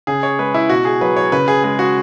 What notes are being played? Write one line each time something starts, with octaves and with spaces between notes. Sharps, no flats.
C#3 G#4
C#5
G#3 B4
E4
B2 F#4
G#4
F#3 B4
C#5
C#3 B4
G#4
G#3 G#4
F#4